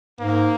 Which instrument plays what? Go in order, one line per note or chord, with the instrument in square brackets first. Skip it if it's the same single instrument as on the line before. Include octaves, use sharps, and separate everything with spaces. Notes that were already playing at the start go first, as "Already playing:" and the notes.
[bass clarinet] G#2 [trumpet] A#3